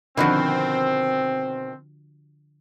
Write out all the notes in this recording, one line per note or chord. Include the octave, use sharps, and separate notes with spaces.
B2 D3 D#3 F3 C4 F#4